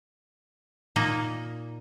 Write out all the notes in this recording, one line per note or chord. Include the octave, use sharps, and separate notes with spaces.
A#2 A#3 D#4